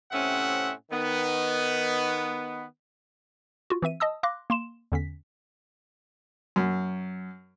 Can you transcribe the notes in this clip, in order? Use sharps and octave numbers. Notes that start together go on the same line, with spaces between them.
A2 C3 C4 C#4 E5 F#5
D#3 B3
F4 F#4
E3 C4 E5 D#7
D#5 A5 D#6 E6
F5 C6 D6 F#6 A#6
A#3 C6 E7
E2 D3 C#4 B6
F#2